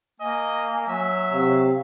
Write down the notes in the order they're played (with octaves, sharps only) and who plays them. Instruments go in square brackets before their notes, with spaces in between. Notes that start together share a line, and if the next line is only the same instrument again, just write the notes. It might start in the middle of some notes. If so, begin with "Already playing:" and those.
[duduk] A#3 [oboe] D#5 [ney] G#5
[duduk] F#3 [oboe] E5
[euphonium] C3 [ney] F5